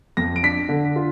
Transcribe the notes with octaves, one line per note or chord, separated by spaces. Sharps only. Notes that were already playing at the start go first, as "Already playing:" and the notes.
F2 A#6
D7
D4 B6
D3
F4